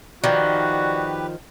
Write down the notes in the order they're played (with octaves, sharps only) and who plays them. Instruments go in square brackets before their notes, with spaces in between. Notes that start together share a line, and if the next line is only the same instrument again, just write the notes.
[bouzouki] D#3 F3 [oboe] F#4 [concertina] G4 B4 [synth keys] D5